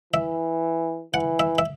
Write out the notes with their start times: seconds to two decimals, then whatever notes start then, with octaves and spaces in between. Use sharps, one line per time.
0.13 E3 E5
1.14 E3 F#5
1.40 E5
1.58 E5